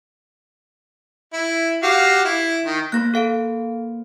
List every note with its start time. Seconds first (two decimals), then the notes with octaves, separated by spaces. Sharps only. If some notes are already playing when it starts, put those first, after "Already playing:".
1.33 E4
1.83 F#4 G4 F5
2.25 E4
2.65 D#3
2.92 A#3 C5 B5 F#6 A#6
3.14 A4 F5 D7